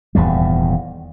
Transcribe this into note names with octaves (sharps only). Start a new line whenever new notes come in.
D#1 E2 G#2 G3